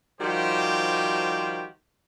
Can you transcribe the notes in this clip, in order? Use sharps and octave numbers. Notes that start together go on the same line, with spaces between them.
D#3 F3 G3 F#4 G4 C5